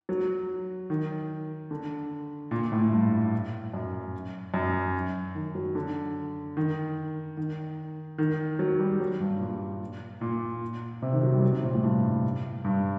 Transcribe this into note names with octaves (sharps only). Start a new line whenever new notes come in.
F#3
D#3
D3
A#2
A2
G2
F#2
F#2
D#3
F#3
D3
D#3
D#3
D#3
F#3
G3
F#3
G2
A#2
A#2
C3
D#3
F#3
G3
F#3
C3
A#2
A2
G2
G2